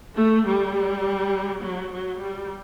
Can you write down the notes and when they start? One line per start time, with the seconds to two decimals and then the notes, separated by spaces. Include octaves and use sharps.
0.18 A3
0.47 G3
1.62 F#3
1.92 F#3
2.21 G3